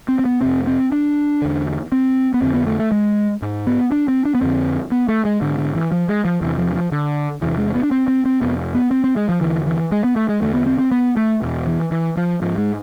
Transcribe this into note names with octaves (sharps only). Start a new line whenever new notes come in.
C4
C4
B3
F2 C3 C4
C4
D4
E2 D3
C4
B3
F2 D3 C4
B3
A3
A3
G#3
G#2
B3
D4
C4
D4
B3
F2 D3 C4
B3
A3
G#3
G#2 D3
D3
E3
F3
G#3
F3
E2 C3 E3
F3
F3
D3
E2 C3 E3
G#3
B3
D4
C4
C4
C4
F2 C3 B3
B3
C4
C4
G#3
F3
E2 D3 E3
E3
G#3
B3
A3
G#3
E2 D3 A3
B3
C4
C4
B3
A3
E2 B2
E3
E3
F3
G#2 F3
G#3